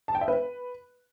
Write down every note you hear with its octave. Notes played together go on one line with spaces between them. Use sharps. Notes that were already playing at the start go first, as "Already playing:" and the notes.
A5
G5
E5
B4